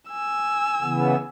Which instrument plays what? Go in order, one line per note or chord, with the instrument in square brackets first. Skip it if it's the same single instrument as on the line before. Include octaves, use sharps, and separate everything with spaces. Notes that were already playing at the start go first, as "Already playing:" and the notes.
[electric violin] G#5 E6
[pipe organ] C#3 E3 B3